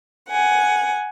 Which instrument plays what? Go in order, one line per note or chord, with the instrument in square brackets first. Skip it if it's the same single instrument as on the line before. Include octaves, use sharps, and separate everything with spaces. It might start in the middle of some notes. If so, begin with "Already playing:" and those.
[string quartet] F#5 G#5